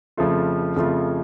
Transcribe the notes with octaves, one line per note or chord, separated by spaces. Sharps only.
F2 C#3 F3 A3 F4
F2 C#3 F3 A3 F4